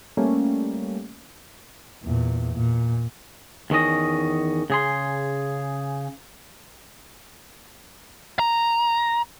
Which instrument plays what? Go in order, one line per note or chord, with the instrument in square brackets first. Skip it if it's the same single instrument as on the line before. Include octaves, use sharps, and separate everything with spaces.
[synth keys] G3 A3 A#3 C#4
[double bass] E2 A#2
A#2
[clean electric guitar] E2 D#3 C#4 D#5
C#3 G#4 C6
[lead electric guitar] A#5